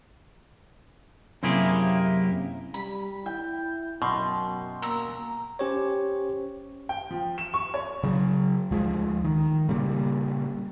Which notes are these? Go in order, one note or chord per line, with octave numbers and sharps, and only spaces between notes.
F#2 C3 A#3 E4 G4 G#4
G3 B5
E4 G5
F#2 B2 C6
A#3 A#5 E6
C#4 G4 C5 C#5
G5
F3
E7
C#6
C#5
C#3 F#3
D2 F3 G#3
D#3
A#2 C#3 G3 A#3